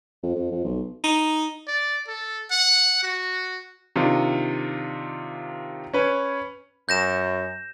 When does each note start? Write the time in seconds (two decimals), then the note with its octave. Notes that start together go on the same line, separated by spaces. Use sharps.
0.23 F2
0.35 F2
0.52 F2
0.64 B1
1.04 D#4
1.68 D5
2.07 A4
2.51 F#5
3.03 F#4
3.96 C3 D#3 D4 F4
5.94 C#4 B4 C#5
6.89 F#2 G6 A#6 E7